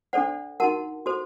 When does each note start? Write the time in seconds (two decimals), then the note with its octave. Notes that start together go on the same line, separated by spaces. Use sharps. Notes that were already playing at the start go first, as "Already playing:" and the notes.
0.13 D4 A4 C5 D5 F#5
0.60 D#4 F#4 A#4 F#5 A5
1.06 F#4 A4 C5